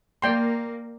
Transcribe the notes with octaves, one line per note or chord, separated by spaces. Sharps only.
A#3 D5 G5 C6